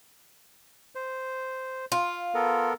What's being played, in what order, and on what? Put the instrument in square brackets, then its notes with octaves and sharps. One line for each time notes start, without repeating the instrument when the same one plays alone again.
[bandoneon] C5
[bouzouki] F4
[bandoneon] B3 A4 A#4